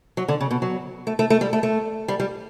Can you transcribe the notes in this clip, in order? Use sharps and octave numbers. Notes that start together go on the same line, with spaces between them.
F#3
D3
C#3
B2
F#3
A3
A3
A3
G3
A3
A3
G3
G3